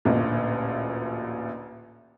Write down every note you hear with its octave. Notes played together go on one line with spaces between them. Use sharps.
A1 D2 A#2